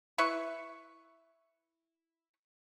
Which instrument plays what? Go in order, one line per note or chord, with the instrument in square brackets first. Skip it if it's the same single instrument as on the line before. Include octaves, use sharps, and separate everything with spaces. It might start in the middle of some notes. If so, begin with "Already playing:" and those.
[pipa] E4 B4 E5 C#6